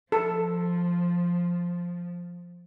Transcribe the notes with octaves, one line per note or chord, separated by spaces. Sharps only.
F3 A4